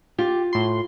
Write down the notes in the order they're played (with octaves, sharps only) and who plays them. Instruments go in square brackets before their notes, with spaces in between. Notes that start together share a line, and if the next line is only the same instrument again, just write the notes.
[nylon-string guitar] F4 [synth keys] G4
[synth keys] A2 C6